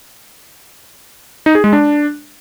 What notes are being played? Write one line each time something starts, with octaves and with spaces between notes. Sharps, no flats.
D#4
G#4
G#3
D4